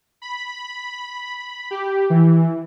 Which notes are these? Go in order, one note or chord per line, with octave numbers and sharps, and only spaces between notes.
B5
G4
E3